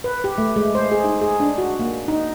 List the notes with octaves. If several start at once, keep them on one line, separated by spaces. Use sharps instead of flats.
B4
G4
A3
G#3
C5
G#4
D#4
G#4
D4
F#4
A#3
D#4